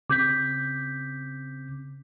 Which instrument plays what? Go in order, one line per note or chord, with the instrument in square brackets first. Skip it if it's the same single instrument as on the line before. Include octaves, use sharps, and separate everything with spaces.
[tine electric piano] C#3 C4 B6 [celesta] D6 G6